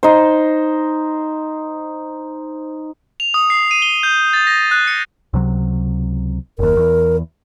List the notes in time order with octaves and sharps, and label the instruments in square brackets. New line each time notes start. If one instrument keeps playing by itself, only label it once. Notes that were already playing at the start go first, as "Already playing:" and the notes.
[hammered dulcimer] D#4 C5
[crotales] F7
D#6
C7
D#7
G7
G6
A6
A#6
F#6
C#7
[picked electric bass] C#2 C3 F#3
[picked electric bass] F#1 D#2 [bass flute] A#4
[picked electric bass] E2